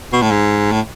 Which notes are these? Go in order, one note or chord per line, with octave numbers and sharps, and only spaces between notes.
B2
A2
G#2
A2